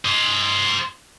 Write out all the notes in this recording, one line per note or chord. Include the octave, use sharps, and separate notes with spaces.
C5 D#5